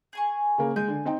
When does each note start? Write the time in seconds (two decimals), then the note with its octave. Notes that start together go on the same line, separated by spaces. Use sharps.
0.13 G#4 G#5 C#6
0.58 C#3 A#3
0.76 G#3 G#5 G6
0.88 D3
1.05 C4 D#4 G5